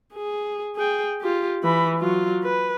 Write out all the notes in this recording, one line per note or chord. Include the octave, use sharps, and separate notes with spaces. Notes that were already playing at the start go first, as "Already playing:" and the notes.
G#4
G#4 G5
F4 G4
E3 B5
F#3 F4
B4